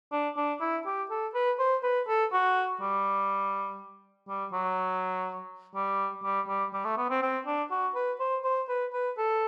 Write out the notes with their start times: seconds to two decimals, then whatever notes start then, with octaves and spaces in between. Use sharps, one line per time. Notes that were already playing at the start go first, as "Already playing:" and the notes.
0.12 D4
0.37 D4
0.61 E4
0.86 G4
1.10 A4
1.34 B4
1.59 C5
1.83 B4
2.08 A4
2.33 F#4
2.81 G3
4.28 G3
4.52 F#3
5.75 G3
6.24 G3
6.48 G3
6.73 G3
6.85 A3
6.98 B3
7.10 C4
7.22 C4
7.46 D4
7.71 F#4
7.95 B4
8.20 C5
8.44 C5
8.69 B4
8.93 B4
9.18 A4